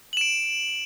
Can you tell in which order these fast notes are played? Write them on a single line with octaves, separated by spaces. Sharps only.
F#7 E7 D7